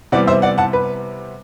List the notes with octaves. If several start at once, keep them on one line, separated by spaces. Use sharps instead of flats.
C3 E3 G3 B3 D5 F#5
C5 E5
D5 F#5
F#5 A5
B4